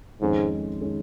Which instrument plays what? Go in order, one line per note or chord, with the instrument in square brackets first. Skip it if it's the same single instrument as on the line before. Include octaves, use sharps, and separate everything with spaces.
[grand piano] F2 D#3 G#3 C#4 G#4 [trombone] G#2
[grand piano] D#3 G#3 C#4 G#4